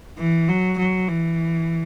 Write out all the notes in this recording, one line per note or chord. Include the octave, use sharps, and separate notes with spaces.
E3
F#3
F#3
E3